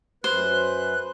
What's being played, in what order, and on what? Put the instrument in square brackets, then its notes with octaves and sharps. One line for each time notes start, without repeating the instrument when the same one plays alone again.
[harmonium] F#2 B4 [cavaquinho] C5 [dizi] F#6